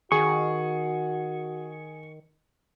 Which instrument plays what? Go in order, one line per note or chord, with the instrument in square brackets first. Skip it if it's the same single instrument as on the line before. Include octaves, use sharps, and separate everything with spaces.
[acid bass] D#3 [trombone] F#4 [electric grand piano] G#4 [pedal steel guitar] C#6